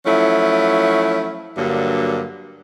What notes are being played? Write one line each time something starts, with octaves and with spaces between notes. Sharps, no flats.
F3 F#3 A3 C#4 E4
G2 D3 F#3 A#3